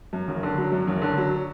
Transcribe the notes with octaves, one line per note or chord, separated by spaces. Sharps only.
F#2
F#1
D3
F#3
F#2
F#1
D3
F#3